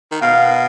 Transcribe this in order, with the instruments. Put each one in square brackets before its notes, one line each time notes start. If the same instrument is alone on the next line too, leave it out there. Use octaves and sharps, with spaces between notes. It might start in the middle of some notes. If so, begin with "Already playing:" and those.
[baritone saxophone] D#3
[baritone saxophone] B2 [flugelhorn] F5